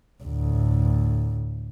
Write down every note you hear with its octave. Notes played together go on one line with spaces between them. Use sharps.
D2 A2